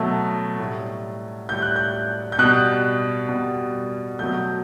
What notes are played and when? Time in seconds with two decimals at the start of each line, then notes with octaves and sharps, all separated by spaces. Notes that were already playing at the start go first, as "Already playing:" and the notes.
Already playing: B2 F#3 A3
0.59 A2 G3
1.49 A2 G3 G6
1.62 F#6
1.76 G6
2.32 G6
2.39 B2 G3 F#6
3.29 B2 G3
4.19 B2 F#3 A3 G6